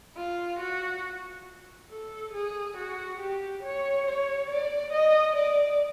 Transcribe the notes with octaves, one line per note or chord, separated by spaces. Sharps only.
F4
F#4
A4
G#4
F#4
G4
C#5
C#5
D5
D#5
D5